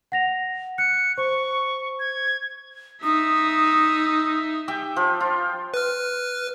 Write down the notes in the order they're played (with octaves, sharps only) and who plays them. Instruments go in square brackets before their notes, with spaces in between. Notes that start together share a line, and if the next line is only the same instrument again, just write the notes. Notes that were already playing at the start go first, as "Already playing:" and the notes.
[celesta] F#5 A#6 F7
[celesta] F#6 [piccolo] C#7
[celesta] C5 [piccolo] C#6
[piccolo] G#6
[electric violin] D#4 E5 [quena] D#6
[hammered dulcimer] G4 E5 G5 G#5
F3
F4
[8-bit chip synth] B4 F6